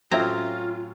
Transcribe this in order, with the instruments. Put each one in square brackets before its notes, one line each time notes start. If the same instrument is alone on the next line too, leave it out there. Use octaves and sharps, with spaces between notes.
[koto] A2 C4 A#5 [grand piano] F#3 C#4 [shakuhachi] F4 [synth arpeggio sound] E5 G#6